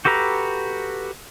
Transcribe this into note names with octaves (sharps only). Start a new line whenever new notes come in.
F#4 G4 A4 B4 A#5